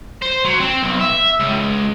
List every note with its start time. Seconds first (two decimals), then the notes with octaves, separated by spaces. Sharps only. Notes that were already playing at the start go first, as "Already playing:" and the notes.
0.22 C5
0.45 F#3
0.61 C4
0.82 B1
1.01 E5
1.40 C#2